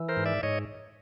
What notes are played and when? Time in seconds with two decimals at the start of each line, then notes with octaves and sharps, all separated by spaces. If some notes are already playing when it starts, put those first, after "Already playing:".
Already playing: E3
0.09 A#4 C5
0.17 G#2
0.25 D5 E5
0.43 G#2 C#5 D#5